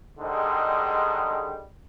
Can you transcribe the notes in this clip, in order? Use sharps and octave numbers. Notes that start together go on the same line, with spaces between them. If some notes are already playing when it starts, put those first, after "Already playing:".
G#2 D3 D#3 G3 G#3